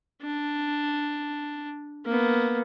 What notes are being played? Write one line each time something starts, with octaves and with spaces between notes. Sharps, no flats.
D4
A#3 B3